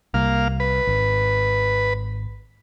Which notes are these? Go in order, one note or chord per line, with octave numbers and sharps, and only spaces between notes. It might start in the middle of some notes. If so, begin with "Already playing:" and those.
C2 A#3 F5
B4
G#1